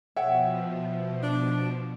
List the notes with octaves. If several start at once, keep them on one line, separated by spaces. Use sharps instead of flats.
B2 F3 C#5 E5 F#5 G5
D4